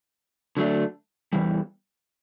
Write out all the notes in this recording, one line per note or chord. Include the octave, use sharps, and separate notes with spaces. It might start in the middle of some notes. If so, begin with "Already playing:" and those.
D3 F#3 A3 D4
E2 C3 E3 G3